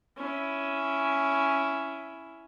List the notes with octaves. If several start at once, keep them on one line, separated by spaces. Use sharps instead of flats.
C#4 E4